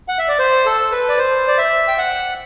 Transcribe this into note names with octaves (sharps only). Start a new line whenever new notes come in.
F#5
E5
D5
C5
A4
B4
D5
C5
D5
E5
G5
F#5